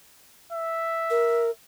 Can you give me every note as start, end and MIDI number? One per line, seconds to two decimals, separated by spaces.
0.52 1.50 76
1.10 1.50 70